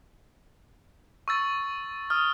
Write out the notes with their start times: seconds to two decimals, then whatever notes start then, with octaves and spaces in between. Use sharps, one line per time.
1.28 C#6 E6 A6
2.10 D#6 F6